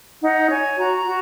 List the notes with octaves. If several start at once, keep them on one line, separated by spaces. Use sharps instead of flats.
D#4 F#5
C#5 G#5
F#4 A#5
A#5
F#4